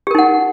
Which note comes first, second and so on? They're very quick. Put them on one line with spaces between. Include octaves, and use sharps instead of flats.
G4 A#4 D#4 F#5